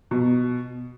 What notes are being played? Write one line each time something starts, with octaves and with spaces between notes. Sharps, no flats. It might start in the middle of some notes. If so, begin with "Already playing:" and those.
B2